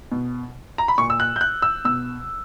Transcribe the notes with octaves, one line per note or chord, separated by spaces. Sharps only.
B2
A#5
B5
A#2 C#6
E6
F#6
G6
F#6
E6
B2 E6